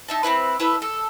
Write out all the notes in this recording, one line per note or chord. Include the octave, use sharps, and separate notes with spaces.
D#4 E5 A5
C4 D#4 E4 B4
E4 A4 B4 E5
A4